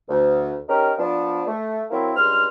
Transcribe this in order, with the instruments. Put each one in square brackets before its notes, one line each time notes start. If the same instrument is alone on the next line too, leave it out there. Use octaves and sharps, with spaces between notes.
[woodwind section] D2
C#4 D#4 G4 A#4
F3 B3 D4
A3
F#3 A#3 C4 E4
C#2 G2 C6 F6